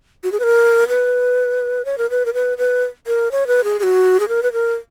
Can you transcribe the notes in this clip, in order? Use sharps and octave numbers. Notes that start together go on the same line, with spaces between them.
F#4
G#4
B4
A#4
B4
C#5
A#4
B4
A#4
B4
B4
A#4
C#5
B4
G#4
G#4
F#4
G#4
A#4
B4
A#4